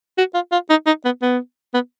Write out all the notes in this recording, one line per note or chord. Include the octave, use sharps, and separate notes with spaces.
F#4
F4
F4
D#4
D#4
B3
B3
B3